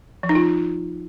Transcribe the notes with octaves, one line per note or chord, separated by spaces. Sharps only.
F3
D#4
F4